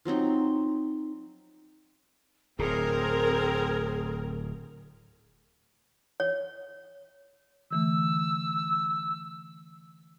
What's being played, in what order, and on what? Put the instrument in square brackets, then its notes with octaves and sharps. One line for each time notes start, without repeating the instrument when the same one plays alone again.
[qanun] F3 F#3 C4 D#4
[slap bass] D1 A2 [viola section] C4 A#4 [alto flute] G#4
[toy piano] C#5
[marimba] D3 E3 A3 [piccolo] E6